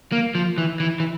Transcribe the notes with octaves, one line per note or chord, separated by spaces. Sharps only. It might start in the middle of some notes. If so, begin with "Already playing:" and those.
A#3
F3
E3
E3
E3